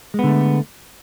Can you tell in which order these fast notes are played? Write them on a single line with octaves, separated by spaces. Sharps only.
G#3 B3 D3 A3